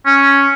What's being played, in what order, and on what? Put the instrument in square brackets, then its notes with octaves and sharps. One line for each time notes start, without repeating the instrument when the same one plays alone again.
[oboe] C#4